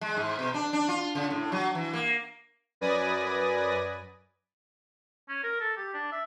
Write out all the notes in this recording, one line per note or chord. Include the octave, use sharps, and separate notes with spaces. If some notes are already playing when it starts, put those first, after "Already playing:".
G#3
G#2
B2
D4
D4
F4
C#3
A2
F#3
E3
A#3
F#2 B4 D5 G#5 D#6 A#6
C#4
A#4
A4
G4
D4
E5